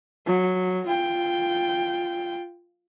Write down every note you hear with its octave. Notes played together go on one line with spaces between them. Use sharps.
F#3
F4 G5